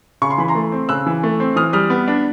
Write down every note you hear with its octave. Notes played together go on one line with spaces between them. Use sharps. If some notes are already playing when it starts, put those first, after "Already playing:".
C#3 C#6
C6
E3 B5
A#5 C6
A3
C4
C#3 E6 F#6
E3
A3
C4
E3 D#6 F6
G3 D#6 F6
B3
D4